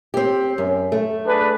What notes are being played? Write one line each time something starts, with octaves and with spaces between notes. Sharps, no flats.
C4 G4
F#2
A3
D4 G#4 B4